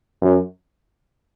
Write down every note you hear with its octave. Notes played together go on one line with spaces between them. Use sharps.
F#2